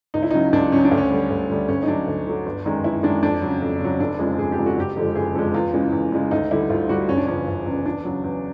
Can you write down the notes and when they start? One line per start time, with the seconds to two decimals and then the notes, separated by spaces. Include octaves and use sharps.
0.14 C#2 D#4
0.23 E4
0.31 C#3 F#3 D#4
0.53 C#2 D4
0.72 C#3 F#3 C#4
0.85 D4
0.91 D2
0.97 C#4
1.10 D3 G3
1.30 D2
1.50 D3 G3
1.68 D2 C#4
1.83 D#4
1.88 D3 F#3 D4
2.07 D2
2.27 D3 F#3
2.46 G1
2.65 F#2 D#3 G#3
2.84 G1 E4
3.03 F#2 D#3 G#3 D4
3.23 F2 D4
3.42 C#3 F#3
3.62 F2
3.81 C#3 F#3
4.00 F1 D4
4.19 F2 C#3 F3 G#3
4.39 F1 G#4
4.52 G4
4.58 F2 C#3 F3 G#3
4.66 F#4
4.77 F#1 G4
4.96 F2 D3 F3 G#3
5.15 F#1 G#4
5.35 F2 D3 F3 G#3 A4
5.54 E2 F4
5.74 C#3 E3 G#3
5.93 E2
6.12 C#3 E3 G#3
6.31 D2 D#4
6.51 D3 G3 E4
6.70 D2 F4
6.89 D3 G3 F#4
7.09 F#1 C#4
7.17 D4
7.27 E2 C#3 F3 C#4
7.47 F#1
7.66 E2 C#3 F3
7.85 E2 D4
8.05 C#3 F#3
8.24 E2